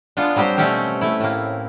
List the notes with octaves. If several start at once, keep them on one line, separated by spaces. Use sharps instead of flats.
G#3 B3 D4 F4
F#3 G3 C4 G4 C5
B2 G3 A3 C4 C#4 G4
A3 E4
A2 A#3